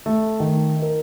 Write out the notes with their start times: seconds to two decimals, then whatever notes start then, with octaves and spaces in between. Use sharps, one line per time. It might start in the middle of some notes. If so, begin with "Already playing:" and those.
0.06 A3
0.40 D#3
0.82 A#4